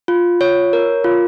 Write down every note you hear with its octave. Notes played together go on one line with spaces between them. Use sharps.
F4
C#5
A#4
F4